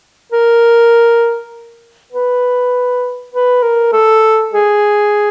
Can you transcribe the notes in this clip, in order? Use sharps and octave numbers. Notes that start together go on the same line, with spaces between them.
A#4
B4
B4
A#4
A4
G#4